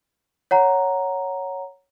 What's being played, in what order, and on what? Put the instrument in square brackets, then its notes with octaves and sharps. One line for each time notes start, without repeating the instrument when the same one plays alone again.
[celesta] C#5 F#5 A#5